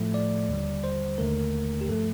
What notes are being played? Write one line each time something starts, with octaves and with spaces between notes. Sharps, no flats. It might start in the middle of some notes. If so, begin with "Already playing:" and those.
Already playing: A2 F3 A3
D5
D#2 D3 G3
C5
D#2 D3 A3 A#4
G4
G2 F3 A3 A4